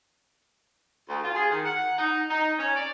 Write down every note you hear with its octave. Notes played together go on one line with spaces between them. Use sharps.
D2
F4
G#4
D#3
F#5
D#4
D#4
C#4
D5